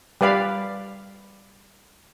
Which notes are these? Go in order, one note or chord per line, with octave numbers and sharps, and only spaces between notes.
G3 B4 D5 F5 B5